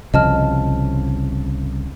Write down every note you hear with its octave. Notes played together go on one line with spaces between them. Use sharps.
C2 C#3 F3 D#5 A5 F6